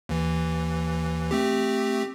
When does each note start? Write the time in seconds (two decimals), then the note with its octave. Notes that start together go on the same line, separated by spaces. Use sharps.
0.09 D#2 E3
1.31 A3 C4 G4